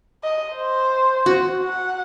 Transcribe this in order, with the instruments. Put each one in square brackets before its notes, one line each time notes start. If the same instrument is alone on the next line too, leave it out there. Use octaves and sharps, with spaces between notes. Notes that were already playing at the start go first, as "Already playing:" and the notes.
[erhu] D#5
C5
[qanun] F#4
[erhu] F#5